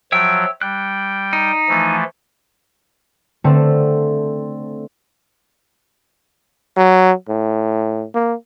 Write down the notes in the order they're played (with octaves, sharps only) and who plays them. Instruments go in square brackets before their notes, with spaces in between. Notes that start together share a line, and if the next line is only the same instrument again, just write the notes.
[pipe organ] F3 F#3 [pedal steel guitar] C#5 E5 G5
[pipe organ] G3 G5 [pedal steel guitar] F#6
[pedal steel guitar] D#4
[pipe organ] E3 F3 A3
[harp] D3 A3 C4 A4
[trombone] F#3
A2
A#3